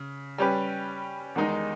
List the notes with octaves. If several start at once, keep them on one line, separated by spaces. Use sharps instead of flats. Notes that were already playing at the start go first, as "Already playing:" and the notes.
Already playing: C#3
G3 C#4 G4 B4
E2 D#3 G#3 D#4